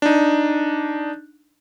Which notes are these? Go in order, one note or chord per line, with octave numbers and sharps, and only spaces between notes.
D4 D#4